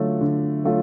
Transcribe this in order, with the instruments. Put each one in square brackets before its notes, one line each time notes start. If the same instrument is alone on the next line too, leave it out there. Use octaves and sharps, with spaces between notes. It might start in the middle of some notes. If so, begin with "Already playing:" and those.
Already playing: [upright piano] D3 F#3 A3 F4
D3
F#3 A3 F4